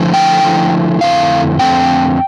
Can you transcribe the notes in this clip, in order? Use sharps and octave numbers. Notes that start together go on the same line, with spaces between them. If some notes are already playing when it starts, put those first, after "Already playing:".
Already playing: D3 F3 A3 E4
G5
D3 F3 A3 E4
F2 D3 A3 C4 E4 F5
F2 D3 A3 C4 E4 G5